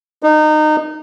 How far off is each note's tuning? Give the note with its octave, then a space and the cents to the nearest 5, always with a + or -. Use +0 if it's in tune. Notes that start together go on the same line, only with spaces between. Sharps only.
D#4 -25